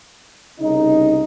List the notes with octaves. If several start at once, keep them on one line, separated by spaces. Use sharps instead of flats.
C2 C#3 D#4